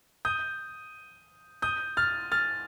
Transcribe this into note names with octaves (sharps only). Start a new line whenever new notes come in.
D#6 G6
D#6 G6
F6 A6
F6 A6